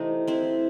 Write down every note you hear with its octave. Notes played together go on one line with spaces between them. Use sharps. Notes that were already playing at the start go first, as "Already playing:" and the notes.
Already playing: C3 E3 A3 C4 D#4
C4 E4